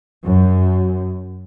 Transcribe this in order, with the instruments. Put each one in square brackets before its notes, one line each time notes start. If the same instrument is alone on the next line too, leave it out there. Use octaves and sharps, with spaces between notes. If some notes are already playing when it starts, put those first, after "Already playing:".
[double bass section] F#2